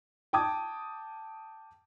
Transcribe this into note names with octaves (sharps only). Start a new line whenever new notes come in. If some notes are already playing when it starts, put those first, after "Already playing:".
G5 A5 D6 D#6 G#6